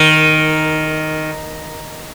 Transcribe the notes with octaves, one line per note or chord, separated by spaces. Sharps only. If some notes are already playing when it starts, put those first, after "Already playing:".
Already playing: D#3